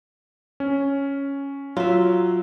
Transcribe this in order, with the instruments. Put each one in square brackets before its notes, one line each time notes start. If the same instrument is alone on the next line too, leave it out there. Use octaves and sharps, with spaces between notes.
[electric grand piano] C#4
[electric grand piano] F#3 [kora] F4 E5